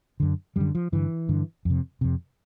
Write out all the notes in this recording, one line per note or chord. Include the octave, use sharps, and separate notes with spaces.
F#2 D3
F#2 D3 G3
F3
G2 D3 E3
G2 D3
F2 C3
F2 C3